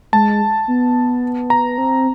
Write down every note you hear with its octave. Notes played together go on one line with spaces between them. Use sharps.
G#3 A5
B3
A#5
C4